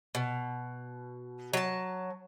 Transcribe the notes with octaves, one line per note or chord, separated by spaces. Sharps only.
B2
F#3 A5